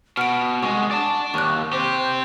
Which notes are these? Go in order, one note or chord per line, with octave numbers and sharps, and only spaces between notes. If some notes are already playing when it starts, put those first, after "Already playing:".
B2 F#5 F6 D7
C2 G#3 C#6
D5 A5
D#2 C#6 F#6
C4 G4 C5